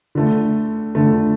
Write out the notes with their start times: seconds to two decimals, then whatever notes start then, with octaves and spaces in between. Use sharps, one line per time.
0.15 D3 A3
0.95 D3 A3